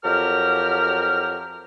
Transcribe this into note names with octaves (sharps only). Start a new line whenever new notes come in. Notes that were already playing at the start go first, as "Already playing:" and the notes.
F2 F#3 G4 A#4 F6